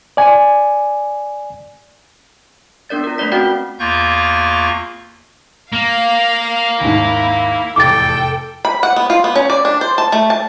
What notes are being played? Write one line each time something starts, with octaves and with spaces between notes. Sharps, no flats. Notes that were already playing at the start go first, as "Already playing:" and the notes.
D5 G#5
B3 D4 A#4 D5 A6
F4 A#4
A3 A#3 B4 D5 B6
C4 C#4 F#4 D5 F#5 G5
E2 A#3 F4 C#6 G6
A#3 F5
D#2 G#2 E4
F1 E2 A2 A4 G5 D6 A6
B5
F#5
B3
F4
B3
C#4
D5
D4
C5
A5
A3
A5